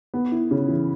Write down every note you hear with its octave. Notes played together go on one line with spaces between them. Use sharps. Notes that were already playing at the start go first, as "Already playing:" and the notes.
B3
E4
C#3
E3